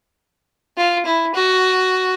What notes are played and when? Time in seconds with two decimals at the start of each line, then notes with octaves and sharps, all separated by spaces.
0.77 F4
1.05 E4
1.34 F#4